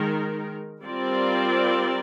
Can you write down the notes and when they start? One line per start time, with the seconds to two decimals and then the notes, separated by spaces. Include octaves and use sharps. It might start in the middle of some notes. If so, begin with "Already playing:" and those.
Already playing: D#3 G#3 D#4 A#4
0.84 G3 C4 F4 A#4 D5